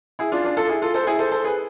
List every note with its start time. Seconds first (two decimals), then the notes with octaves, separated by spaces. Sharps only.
0.19 E4 G#4
0.32 D4 F4
0.44 D4 F4
0.57 F4 A4
0.69 E4 G#4
0.82 F4 A4
0.94 A4 C5
1.07 E4 G#4
1.19 A4 C5
1.31 A4 C5
1.44 G#4 B4